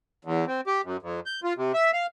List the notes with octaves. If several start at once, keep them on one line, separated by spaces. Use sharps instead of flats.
E2
C4
G4
F#2
F2
G6
F4
C3
E5
F5